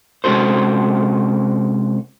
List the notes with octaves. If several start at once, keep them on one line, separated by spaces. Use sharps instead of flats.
C3 G#3 C#4 F#4 A4 C5